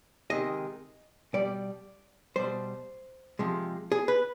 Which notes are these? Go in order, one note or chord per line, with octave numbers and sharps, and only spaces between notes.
C3 D#3 G#3 D#5
B2 G3 D5
B2 G3 C5
C3 F3 G#3
G#4
B4